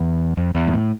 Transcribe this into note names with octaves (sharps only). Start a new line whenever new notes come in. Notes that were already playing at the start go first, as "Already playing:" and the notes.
Already playing: E2
F2
E2
G#2
A2